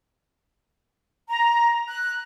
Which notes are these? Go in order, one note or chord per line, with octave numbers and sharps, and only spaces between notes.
A#5
F#6